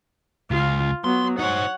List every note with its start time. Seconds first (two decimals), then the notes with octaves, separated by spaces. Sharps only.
0.51 C#2 F4
1.04 F#3 B3 C6
1.39 D#4 C5 C#5 F#5